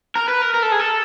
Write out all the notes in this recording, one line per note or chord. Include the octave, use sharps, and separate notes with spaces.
A#4
B4
A#4
A#4
A4
G#4
A4